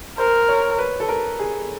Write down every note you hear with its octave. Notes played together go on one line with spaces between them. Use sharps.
A#4 C5
C#5
B4
A4
A#4
G#4